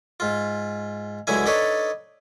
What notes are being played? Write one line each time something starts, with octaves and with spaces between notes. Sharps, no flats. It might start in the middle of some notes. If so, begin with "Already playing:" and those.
G#2 F4
C#2 D3 F#3 E4 G#5
D4 D#4 A4 B4 C#5 D5